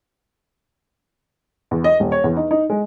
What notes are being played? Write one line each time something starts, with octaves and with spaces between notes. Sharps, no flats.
E2
D#5
D#1
C#5
E2
D#4
D#4
G#3